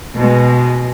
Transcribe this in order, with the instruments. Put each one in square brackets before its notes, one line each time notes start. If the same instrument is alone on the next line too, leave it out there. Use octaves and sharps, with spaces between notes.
[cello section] B2 G#3